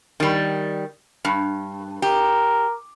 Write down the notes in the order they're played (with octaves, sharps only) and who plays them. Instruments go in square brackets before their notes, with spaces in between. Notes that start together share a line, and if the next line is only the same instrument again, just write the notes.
[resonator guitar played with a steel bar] D#3 G3
G2
[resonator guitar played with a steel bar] G4 [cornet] A#4